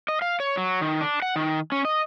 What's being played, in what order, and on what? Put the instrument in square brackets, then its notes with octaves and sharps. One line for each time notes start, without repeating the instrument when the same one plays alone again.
[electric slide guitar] D#5
F5
C#5
F#3
D#3
D4
F#5
D#3
C#4
D#5